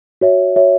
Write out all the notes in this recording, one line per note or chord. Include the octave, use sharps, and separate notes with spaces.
F#4 C#5 E5
F#4 C#5 E5